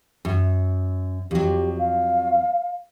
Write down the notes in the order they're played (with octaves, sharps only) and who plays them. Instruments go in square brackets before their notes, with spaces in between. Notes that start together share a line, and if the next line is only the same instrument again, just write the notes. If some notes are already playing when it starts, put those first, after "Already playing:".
[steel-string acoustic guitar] F#2
[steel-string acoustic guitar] F2 F#3 [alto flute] G4
[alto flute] F5